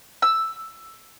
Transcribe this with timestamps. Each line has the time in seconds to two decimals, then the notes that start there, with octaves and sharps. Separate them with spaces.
0.22 E6